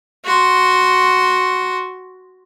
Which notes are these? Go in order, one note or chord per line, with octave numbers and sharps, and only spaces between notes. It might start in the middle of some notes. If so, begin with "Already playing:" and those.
F#4 C6